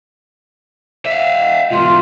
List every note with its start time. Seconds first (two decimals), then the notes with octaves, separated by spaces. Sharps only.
1.05 E5 F5
1.71 E2 G#2 F4